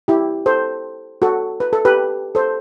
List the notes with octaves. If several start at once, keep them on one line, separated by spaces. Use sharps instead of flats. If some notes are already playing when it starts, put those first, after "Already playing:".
E4 G4
A4 C5
F#4 A4
B4
A4
G4 B4
A4 C5